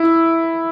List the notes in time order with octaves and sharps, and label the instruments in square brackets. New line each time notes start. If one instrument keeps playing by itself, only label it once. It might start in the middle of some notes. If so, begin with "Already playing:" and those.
Already playing: [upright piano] E4